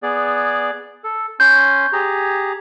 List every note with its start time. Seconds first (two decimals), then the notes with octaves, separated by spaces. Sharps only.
0.03 B3 G#4 D5
1.04 A4
1.40 C#4 C6 G6
1.93 G4 G#4 A#5